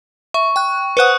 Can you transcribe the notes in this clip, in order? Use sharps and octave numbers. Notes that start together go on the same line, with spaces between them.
E5 C#6
G5 F#6
B4 C5 F#5 D#6 F#6 C#7